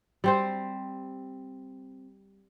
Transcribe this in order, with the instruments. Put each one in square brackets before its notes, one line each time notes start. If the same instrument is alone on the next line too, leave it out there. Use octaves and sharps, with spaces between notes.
[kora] G3 C4 C5